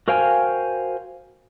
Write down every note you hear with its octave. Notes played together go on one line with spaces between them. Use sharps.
F#4 A#4 C5 F5 G5 G#5